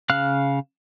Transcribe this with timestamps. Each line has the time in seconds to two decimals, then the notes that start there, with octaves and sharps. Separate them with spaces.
0.10 C#3 F5 F6 F#6